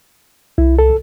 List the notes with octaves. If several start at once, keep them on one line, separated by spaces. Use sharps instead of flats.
C2 E4
A4